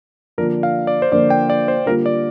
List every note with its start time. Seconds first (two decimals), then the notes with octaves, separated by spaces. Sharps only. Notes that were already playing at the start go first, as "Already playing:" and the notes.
0.38 D3 F3 A#3 D4 F4 A#4
0.63 F5
0.87 D5
1.02 C5
1.12 D3 F3 A#3 D4 F4 D5
1.30 G5
1.50 D5
1.68 C5
1.86 D3 G3 A#3 F4 A#4
2.06 D5